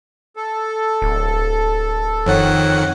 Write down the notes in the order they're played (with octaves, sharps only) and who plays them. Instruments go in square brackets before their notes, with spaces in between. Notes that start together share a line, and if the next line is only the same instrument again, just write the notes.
[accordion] A4
[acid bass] D1
[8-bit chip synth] F2 D#3 F#5 [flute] C#5